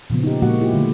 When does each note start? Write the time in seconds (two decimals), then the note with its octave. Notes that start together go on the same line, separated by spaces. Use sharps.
0.10 A#2 C#3 F3 B3
0.23 D#4 G4
0.42 A#2 F3 G#3 A#3 F#4 F#5
0.61 E4 F4 G4
0.73 D3 G#3 A3